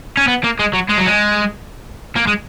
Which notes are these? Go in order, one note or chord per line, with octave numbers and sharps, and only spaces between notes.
C#4
B3
A#3
G#3
F#3
G#3
F#3
G#3
A#3
G#3